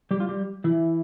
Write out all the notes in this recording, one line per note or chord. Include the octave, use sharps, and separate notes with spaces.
G3 G4
F4
G3 G4
E3 E4